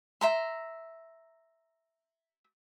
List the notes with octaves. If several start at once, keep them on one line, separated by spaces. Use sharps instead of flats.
E5 A#5 C6